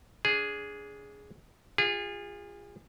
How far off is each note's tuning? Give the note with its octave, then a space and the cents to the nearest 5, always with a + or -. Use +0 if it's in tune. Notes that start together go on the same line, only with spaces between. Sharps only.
D4 -30 G#4 +0
F4 +10 G#4 -30